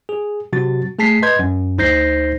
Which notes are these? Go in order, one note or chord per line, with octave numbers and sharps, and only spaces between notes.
G#4
C3 F#3 F#4 A6
A3 G#4 A5 B6 C7
B4 D#5 C6 G6 G#6
F#2
D2 D#4 C5 G6 A#6 C7